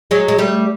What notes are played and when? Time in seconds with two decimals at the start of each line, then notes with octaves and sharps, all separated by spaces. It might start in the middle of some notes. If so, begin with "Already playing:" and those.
0.11 F#3 G#3
0.28 G#3
0.38 G3 A3